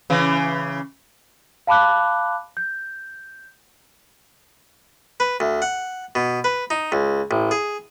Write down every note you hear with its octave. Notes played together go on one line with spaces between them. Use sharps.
C#3 E3
F5 A5 B5 D6 F#6
G6
B4
D2
F#5
B2
B4
D#4
C#2
A1
G#4